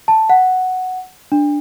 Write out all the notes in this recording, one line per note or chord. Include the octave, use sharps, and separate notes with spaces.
A5
F#5
D4